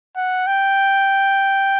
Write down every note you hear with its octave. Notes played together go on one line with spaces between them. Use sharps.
F#5
G5